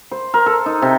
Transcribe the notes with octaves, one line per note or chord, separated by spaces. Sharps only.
C5
A#4
A4
D#4
C3